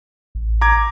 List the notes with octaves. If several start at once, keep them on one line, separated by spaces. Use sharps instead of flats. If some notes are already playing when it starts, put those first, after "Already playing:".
A1
A#5 D6 G#6